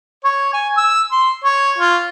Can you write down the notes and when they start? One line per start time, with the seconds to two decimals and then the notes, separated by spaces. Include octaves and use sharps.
0.24 C#5
0.53 G#5
0.77 E6
1.12 C6
1.44 C#5
1.78 F4